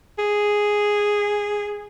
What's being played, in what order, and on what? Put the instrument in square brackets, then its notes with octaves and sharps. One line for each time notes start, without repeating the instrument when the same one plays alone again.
[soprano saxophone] G#4